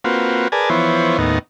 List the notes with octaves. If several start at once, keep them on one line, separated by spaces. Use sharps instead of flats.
A#3 C4 F4 F#4 B4
G#4 A#4 B4 D5 G#5 A5
E3 F3 B3 E4 C5 C#5
D#2 A2 B3 D#4